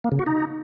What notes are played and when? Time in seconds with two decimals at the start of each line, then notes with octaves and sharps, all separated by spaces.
0.04 A#3
0.12 C#3
0.19 F#4
0.26 D#4